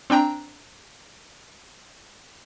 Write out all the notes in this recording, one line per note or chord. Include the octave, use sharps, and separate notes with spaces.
C4 D4 G5 A#5